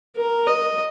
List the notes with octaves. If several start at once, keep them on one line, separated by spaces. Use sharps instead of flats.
A#4
D#5